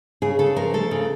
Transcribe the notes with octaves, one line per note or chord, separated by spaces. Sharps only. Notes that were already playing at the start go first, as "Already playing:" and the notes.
C#3 G#4
C#3 A4
F3 A#4
A3 A4
C#3